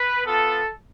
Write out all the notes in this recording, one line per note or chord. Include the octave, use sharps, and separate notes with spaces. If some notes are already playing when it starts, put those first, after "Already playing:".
Already playing: B4
B3 F4 A4